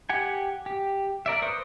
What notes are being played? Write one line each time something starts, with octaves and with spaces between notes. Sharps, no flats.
G4 F#5 G#5
G4
A#4 D5 E5
B4 C5 C#6 D#6